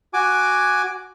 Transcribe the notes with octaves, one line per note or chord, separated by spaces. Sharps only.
F#4 G#5 D6